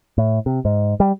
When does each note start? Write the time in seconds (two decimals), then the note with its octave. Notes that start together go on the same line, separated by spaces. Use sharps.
0.18 A2
0.46 C3
0.65 G#2
1.00 G3